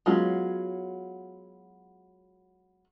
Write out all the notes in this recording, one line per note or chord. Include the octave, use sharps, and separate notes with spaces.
F#3 G#3 B3 C#4 F4